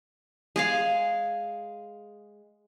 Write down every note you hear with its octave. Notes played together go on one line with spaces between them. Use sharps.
G#3 G#4 F5